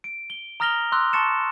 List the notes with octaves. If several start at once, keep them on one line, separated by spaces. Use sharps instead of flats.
D7
G7
A#5 D#6 F6 A#6 F7 G7
C6 D6 E6 F#6
A5 C6 C#6 A6 C#7 E7